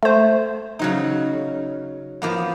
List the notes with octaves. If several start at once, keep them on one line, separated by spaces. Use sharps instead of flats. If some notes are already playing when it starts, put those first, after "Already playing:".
A3 C5
C#3 F#3 D#4
F3 A#3 B3